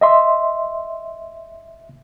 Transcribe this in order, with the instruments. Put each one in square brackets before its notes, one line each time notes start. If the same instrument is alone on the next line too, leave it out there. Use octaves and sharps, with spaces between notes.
[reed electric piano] D#5 E5 C6